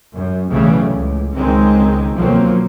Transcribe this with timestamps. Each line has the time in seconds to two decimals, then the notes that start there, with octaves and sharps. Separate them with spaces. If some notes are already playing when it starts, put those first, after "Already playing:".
0.13 F#2
0.50 B1 A2 C#3 E3 G3 A3
0.88 C#2
1.35 C#2 D#3 G#3 C4
2.15 B1 F3 F#3 A#3 C4